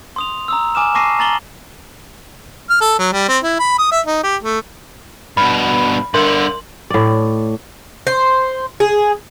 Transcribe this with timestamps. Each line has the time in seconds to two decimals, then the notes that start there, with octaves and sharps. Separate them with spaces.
0.16 C6 D#6 F7
0.48 A#5 D#6 E6
0.75 G#5 D6 D#6 F6 E7
0.94 A5 C#6 D6 A#6 C7 D#7
1.19 A#5 A6 F#7 G7
2.70 F6
2.81 A4
2.99 F#3
3.13 G3
3.28 C4
3.44 E4
3.59 B5
3.79 D#6
3.92 E5
4.06 D#4
4.23 G4
4.43 A3
5.37 G2 B2 B5
6.14 G2 D3 A#4 C6 F#7
6.90 A2 D5
8.07 C5
8.80 G#4